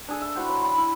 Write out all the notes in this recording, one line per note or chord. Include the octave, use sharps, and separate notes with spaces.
D4 G#4 A4
E5 A5
E4 F#4 C5 G5
F#3
D5 G5 B5 C6
E4